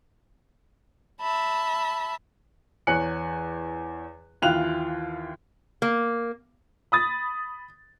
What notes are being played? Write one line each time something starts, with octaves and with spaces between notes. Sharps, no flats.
E5 A5 B5
E2 C#5 G#5 F#6 C#7 F#7
D#2 E3 F4 G5 F#6 F7
A#3
B5 D#6 A6